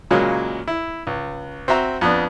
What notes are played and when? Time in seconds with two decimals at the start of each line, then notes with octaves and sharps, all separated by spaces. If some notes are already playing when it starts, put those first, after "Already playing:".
0.11 A#2 C#3 F#3 G#3 A#3
0.68 E4
1.07 C#2
1.68 C4 F#4 E5 A#5 C6
2.01 F2 B3 D4